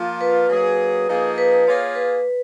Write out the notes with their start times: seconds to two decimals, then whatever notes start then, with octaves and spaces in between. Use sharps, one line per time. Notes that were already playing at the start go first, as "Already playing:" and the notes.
Already playing: F3 A#3 F4
0.21 B4
0.50 F#3 A#3 C#4 G#4
1.08 F3 A#3 D#4 G#4
1.38 B4
1.52 B4
1.67 A#3 F4 G#4 C#5
1.95 B4